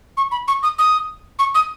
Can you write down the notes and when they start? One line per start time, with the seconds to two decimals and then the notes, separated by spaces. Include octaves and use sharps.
0.17 C#6
0.31 B5
0.48 C#6
0.63 D#6
0.78 D#6
1.39 C#6
1.55 D#6